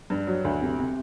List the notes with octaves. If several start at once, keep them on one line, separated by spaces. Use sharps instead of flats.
G2
F#3
D2
C3
C3